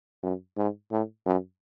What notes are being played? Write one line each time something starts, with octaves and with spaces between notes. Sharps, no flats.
F#2
G#2
A2
F#2